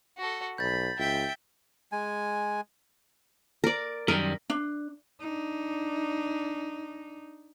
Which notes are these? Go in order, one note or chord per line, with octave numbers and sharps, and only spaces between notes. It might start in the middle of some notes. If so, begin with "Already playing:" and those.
F#4 A4
B1 B5 G6 A6
C#2 E5 G5
G#3 G#5
A#4 D5
F#2 D#3 G3 A#4
D4
D4 D#4